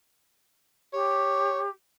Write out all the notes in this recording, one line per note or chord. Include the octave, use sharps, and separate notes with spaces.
G4 C#5